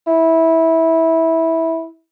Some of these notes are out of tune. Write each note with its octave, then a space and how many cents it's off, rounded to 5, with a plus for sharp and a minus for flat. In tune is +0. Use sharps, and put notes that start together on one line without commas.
E4 -15